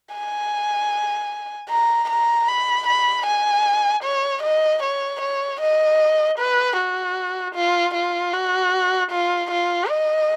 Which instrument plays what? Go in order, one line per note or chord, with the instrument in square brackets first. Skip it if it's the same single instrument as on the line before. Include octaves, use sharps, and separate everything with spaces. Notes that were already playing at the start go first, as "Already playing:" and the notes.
[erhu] G#5
A#5
A#5
B5
B5
G#5
C#5
D#5
C#5
C#5
D#5
B4
F#4
F4
F4
F#4
F4
F4
D#5